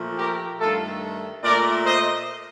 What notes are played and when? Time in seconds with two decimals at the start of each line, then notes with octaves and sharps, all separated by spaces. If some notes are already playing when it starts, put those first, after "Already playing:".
Already playing: A#2 F3 A3
0.18 G4 A#4
0.60 G2 D#3 A3 F4 A4
1.43 A#2 A3 A#4 D5
1.85 C5 D#5